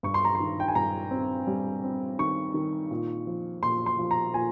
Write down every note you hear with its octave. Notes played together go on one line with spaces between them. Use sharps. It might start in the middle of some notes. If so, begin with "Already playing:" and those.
G2 C#6
C6
A#5
C6
D#3
G5
G#5
G2 A#5
C4
G3
C4
D#3 C#6
D#3
A#2
F3
A#2 C6
C6
F3
A#5
A#2 G#5